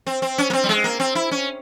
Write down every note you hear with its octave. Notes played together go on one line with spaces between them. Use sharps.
C4
C4
C#4
A#3
C4
G3
G#3
A#3
C4
E4
C#4